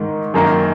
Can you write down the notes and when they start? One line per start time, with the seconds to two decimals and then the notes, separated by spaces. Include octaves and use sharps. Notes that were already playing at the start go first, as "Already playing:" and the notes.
Already playing: G#2 D#3 G#3
0.34 F#2 D#3 A#3 D#4